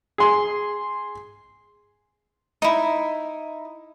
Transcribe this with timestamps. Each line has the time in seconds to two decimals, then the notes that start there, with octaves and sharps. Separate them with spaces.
0.18 G#4 C6
2.62 D#4 E4